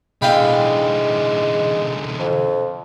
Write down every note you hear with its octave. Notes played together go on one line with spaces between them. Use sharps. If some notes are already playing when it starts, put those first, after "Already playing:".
B2 D3 E3 G#3 F5 G5 B5
F2